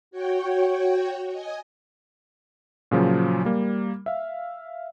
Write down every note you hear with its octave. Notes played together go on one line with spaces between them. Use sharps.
F#4 C#5 G5
D#5 G#5
A#2 C#3 F3 F#3
G3 A#3
E5 F5